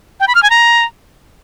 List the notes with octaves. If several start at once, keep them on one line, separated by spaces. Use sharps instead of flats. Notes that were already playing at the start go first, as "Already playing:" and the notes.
G5
B5
F6
G#5
A#5